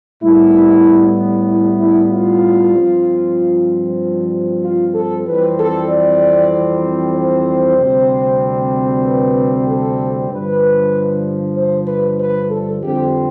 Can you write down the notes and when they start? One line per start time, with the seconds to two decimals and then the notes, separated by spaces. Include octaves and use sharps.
0.23 A2 G3 B3 E4
1.48 E4
1.80 E4
2.12 F4
2.74 G2 F3 C4
4.64 F4
4.95 A4
5.26 F2 E3 G3 C4 B4
5.58 A4
5.90 D5
7.16 C5
7.78 D2 C3 G3 C4
9.05 B4
9.68 A4
10.31 G2 D3 F3 B4
11.57 C5
11.88 B4
12.19 B4
12.51 A4
12.83 F2 D3 G3 C4 G4